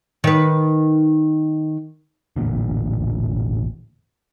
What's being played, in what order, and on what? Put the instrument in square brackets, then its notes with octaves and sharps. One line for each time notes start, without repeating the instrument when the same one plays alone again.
[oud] D#3 B4
[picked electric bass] E1 A1 A#2 D3